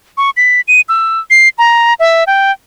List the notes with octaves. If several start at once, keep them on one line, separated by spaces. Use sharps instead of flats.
C#6
B6
D#7
E6
C7
A#5
E5
G5